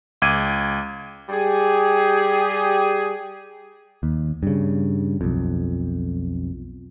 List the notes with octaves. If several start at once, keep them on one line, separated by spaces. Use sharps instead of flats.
C#2 D6 G#6 D#7
G3 G4 G#4
D#2
G2 C#3
B1 F2